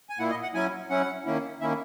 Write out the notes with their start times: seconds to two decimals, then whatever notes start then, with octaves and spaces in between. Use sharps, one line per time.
0.10 G#5
0.18 A#2 A#3 E4 F#5
0.30 D#5
0.43 F#5
0.54 F#3 C#4 E4 G#5
0.90 F#3 C#4 E4 F#5
1.26 D#3 A#3 C#4 E4
1.61 D#3 A#3 C#4 E4 E5